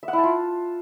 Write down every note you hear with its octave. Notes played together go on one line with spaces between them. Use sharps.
E5
F#5
E4
A5
F4